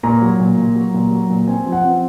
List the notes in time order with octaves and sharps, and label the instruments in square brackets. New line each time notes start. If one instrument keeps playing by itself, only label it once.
[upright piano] A#2 A#5
F#3
A#2
A#2
F#3
A#2
F#3
A#2
C4 G#5
F3
F#5
C4